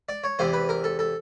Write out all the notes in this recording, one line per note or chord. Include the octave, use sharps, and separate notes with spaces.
D5
C#5
E2 C3 E3 C5
B4
A#4
A4
A4